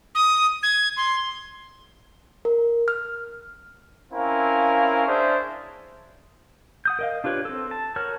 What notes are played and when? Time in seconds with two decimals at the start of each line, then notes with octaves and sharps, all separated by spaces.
0.15 D#6
0.63 G#6
0.97 C6
2.45 A#4
2.88 F6
4.12 C4 C#4 E4 A#4 F5
5.06 C#4 D4 G#4 C5 C#5 E5
6.85 F#5 D#6 G6
6.99 A#4 D#5 F5
7.24 D4 F4 G4 B4 C#5
7.45 C4 A4
7.71 A5
7.96 F#4 A#4 C#5 F6